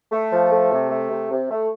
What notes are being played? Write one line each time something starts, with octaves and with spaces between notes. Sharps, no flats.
A3
F3
A3
C3
A3
C3
C3
A3